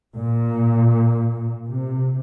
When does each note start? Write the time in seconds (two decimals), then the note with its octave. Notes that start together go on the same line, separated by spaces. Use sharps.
0.16 A#2
1.68 C3